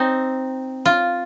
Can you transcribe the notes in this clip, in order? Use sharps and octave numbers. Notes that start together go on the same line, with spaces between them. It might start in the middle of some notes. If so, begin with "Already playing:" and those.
Already playing: C4 D#4
F4